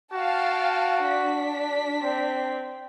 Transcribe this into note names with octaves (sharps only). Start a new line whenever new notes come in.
F#4 F5 G5 A5
D4 B6
C4